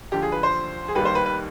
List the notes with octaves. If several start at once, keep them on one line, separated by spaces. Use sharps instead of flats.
D#2 D3 F3 G4
G#4
B4
C5
G#4
D#2 D#3 G3 B4
C5
B4
B4